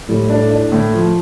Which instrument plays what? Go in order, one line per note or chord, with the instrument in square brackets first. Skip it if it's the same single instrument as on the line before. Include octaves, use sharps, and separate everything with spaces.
[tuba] A2 [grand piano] G3
[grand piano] D4
D4
A2
F3